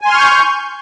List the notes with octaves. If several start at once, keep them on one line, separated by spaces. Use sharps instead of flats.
G#5 C6 C#6 F6 G6